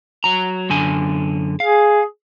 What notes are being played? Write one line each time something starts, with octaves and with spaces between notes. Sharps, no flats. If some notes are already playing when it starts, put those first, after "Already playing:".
F#3 A#5
F#2 D3 G#5
G#4 F5